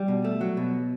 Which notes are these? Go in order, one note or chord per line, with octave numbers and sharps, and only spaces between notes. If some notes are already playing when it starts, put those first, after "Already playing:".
Already playing: G3
B2
A3
F#3
B2